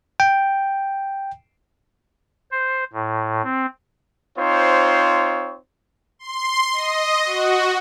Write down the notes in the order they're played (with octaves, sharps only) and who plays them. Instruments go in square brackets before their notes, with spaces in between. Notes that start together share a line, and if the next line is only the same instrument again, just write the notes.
[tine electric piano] G5
[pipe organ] C5
A2
C4
[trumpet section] C4 D#4 F4 C5 C#5
[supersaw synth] C6
D#5
F#4